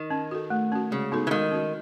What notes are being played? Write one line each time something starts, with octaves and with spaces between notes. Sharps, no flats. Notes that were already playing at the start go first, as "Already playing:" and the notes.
Already playing: D#3
C#4
F#4 A4
A3
C#4 F#4
C#3 G#3
B3 D#4 F#4 A4
E3
D#3 G#3
C#4 F#4